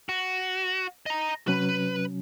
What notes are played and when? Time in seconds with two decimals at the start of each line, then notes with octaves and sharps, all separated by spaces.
0.09 F#4
1.06 D#5 A#5
1.48 C3 F#3 C#4 B4